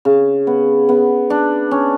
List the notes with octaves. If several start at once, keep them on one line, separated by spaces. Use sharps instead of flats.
C#3
B3
B3
D4
C#4